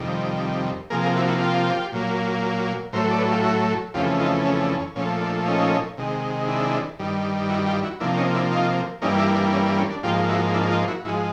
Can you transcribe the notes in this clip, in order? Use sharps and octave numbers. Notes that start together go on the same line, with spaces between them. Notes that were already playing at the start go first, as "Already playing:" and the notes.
Already playing: F2 C3 D#3 G3
C3 F3 A#3 G#4 A#4
G#4 A#4
E4 F#4
E4 F#4
F4 G4
A#2 F#3 A#3
A2 F#3 A3 A#4 C5
D5
B4 C#5
F4 G4
E4 F#4
F2 C#3 E3 A3 F4 G4
D#4 F4
C#4
D4
C#4
A#2 F3 A3 C#4
D4
C#4 D#4
C3 D#3 G#3
D4 E4
G2 D#3 G3
E4 F#4
F4 G4
E4 F#4
C3 F3 A#3 D4 E4
C#4 D#4
D4 E4
D#4 F4
G2 E3 G3 A#3 C#4 D#4
D4 E4
D4
C#4
D4
C#4
D4
G#2 F3 A#3 F4 G4
E4 F#4
D4 E4
D#4 F4
E4 F#4
G#2 F3 G#3 E4 F#4